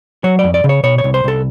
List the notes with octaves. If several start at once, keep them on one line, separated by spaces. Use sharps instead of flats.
F#3 C#5
F2 D5
D5
C#3
C#5
B2 C#5
C#5
C2
C5
C2 A4